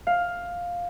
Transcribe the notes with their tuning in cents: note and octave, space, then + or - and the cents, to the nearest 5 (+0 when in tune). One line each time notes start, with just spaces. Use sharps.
F5 +10